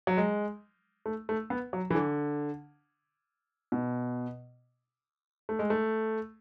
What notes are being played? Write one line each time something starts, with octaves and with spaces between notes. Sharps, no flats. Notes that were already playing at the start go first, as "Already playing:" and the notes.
F#3
G#3
A3
A3
B3
F#3
E3
D3
B2
A3
G#3
A3